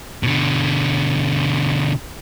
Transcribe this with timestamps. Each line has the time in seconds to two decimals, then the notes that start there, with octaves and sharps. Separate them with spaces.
0.23 B2 D3